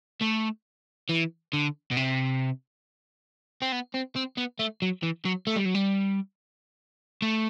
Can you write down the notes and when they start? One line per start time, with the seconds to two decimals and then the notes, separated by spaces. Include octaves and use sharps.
0.22 A3
1.10 E3
1.53 D3
1.91 B2
1.97 C3
3.62 C4
3.72 B3
3.94 C4
4.16 C4
4.37 B3
4.59 A3
4.82 F#3
5.03 E3
5.25 F#3
5.47 A3
5.56 G3
5.65 F#3
5.75 G3
7.22 A3